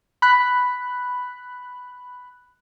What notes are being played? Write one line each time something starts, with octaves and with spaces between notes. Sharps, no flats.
B5 F#6